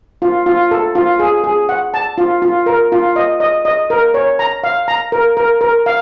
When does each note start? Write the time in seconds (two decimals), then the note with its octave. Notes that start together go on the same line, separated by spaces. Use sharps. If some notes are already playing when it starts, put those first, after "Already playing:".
0.22 F4
0.46 F4
0.71 A4
0.95 F4
1.19 G#4
1.44 G#4
1.69 F#5
1.94 A5
2.18 F4
2.42 F4
2.66 A#4
2.92 F4
3.16 D#5
3.40 D#5
3.65 D#5
3.90 A#4
4.14 C#5
4.39 A#5
4.64 F5
4.88 A#5
5.12 A#4
5.37 A#4
5.61 A#4
5.86 F5